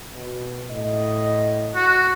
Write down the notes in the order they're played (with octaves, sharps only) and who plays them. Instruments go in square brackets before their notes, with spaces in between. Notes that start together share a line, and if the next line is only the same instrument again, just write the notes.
[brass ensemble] B2
A2 D#5
[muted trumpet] F#4